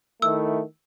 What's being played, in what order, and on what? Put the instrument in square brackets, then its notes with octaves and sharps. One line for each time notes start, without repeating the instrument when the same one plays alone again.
[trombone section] D#3 A3 E4 [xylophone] E6